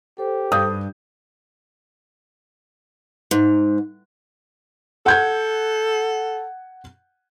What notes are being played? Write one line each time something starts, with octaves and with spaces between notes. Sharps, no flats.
G4 A4 C5
G2 D#6 G6
G#2
A4 F#5 G6 G#6